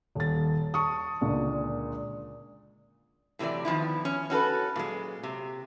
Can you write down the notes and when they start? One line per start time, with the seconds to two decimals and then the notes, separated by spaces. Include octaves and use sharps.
0.15 D#1 A6
0.74 A5 C#6 D#6
1.21 C#2 A#2 D3
3.39 A2 C3 E3 F#3 D5
3.65 D#3 F3 B3 E4
4.05 C#4
4.30 C#4 F#4 A4 B4
4.76 A#2 F#3 G#3
5.23 C3